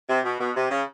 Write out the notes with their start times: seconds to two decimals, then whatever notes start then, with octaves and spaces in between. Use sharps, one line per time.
0.09 C3
0.25 B2
0.40 B2
0.56 C3
0.71 C#3